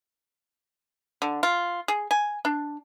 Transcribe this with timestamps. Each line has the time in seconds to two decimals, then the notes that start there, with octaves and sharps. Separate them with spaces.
1.22 D3
1.43 F4
1.88 G#4
2.11 G#5
2.45 D4